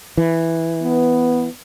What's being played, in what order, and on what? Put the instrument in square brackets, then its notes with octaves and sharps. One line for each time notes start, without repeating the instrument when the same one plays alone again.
[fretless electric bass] E3
[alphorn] B3